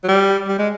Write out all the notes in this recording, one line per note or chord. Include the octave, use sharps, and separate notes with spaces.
F#3
G3
G3
G#3